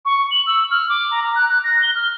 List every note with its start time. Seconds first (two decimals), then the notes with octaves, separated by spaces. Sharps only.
0.05 C#6
0.31 F#7
0.47 E6
0.71 F6
0.89 D6
1.11 A#5
1.24 A#5
1.36 F#6
1.49 F#6
1.64 A#6
1.82 G7
1.95 F6